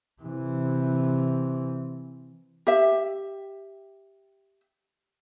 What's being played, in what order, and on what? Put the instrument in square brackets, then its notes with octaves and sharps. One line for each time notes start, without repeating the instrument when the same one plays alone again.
[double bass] C3 E3
[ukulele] G4 E5